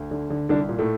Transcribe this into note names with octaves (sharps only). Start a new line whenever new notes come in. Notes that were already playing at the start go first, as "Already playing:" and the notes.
Already playing: D2
D3
D3
C2 D3 D4
A#2
A2 A3